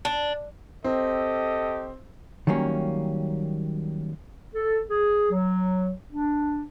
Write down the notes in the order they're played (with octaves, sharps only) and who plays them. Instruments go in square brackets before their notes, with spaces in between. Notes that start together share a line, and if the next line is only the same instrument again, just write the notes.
[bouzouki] D4
[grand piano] C4 [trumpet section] G4 A4 D#5
[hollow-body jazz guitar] D#3 F#3 G3 A#3 C#4
[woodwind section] A4
G#4
F#3
D4